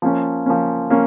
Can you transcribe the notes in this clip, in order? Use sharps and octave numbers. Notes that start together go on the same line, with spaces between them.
F3 A#3 C#4
F3 A#3 C#4
F3 A#3 C#4